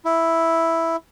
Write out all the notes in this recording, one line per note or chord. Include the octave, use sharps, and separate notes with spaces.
E4